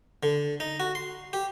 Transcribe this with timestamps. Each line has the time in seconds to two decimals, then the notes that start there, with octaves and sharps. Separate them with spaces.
0.23 D3
0.60 D#4
0.80 F#4
0.95 C6
1.33 G4